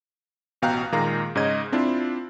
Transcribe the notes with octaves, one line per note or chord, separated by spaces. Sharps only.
A1 B2 F5 G5 A#5 F#6
A#2 D#3 G#3 A#3 F5 A#5
G#2 C#3 D#4 C#5 D#5 G#6
C4 D4 E4 F4